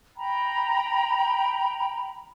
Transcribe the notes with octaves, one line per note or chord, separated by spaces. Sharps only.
G5 A#5 B5